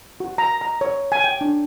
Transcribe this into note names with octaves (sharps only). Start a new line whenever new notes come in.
F#4
A#5
A#5
C#5
G#5
G5
D4